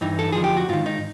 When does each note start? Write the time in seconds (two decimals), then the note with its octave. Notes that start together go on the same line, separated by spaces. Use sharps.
0.01 G2 E3 D#4
0.19 A4
0.32 F2 D3 F3 G#4
0.44 G4
0.57 F#4
0.69 G#2 D#3 F4
0.86 D#4